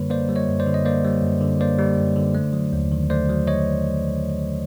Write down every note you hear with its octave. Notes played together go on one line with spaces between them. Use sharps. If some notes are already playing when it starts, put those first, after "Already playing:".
Already playing: F#2 D3 G3 A#3 B4 C#5
A#3 C5 D5
G3
C#5 D#5
F#2
C5 D5
D3
D#5
A#3 C5 D5
G3
F#2
D3
A#3 C5 D5
G3
F#2
D3
A3
F#3
D#2
D#3
A3 C5 D5
F#3
C#5 D#5